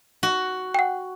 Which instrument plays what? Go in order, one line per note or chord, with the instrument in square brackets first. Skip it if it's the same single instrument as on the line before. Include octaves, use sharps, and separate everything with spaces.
[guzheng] F#4
[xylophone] F#5 G5